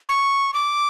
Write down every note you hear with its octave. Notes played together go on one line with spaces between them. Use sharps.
C#6
D6